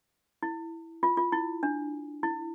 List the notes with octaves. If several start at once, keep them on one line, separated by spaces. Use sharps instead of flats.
E4
F4
F4
E4
D4
E4